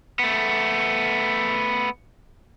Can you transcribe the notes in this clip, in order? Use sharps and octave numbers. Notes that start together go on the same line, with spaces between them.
A3 B3